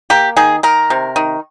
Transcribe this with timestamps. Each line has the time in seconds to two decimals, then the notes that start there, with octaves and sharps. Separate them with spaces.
0.10 A#3 G4
0.37 D#3 G#4
0.63 D#3 A#4
0.90 C3
1.16 D#3